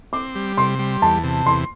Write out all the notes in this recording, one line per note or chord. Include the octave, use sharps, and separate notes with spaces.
C4 D6
G3
C3 C6
G3
E2 A5
C3
E2 C6